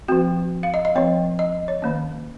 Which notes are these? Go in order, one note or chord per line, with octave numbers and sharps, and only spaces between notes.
F3 C4 F#4
F5
D#5
D#5
F3 C4 C#5
D#5
C#5
D#3 A#3 C#4